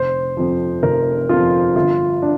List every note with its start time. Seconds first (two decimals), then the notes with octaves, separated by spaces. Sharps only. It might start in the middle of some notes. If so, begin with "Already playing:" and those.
Already playing: F1 C5
0.37 F2 F3
0.83 F1 A#4
1.29 F2 F3 F4
1.75 G1 F4
2.22 D4